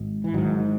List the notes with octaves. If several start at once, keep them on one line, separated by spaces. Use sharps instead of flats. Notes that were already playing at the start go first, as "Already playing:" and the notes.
Already playing: G#1 G#2
E3
G#1 G#2 D#3 F#3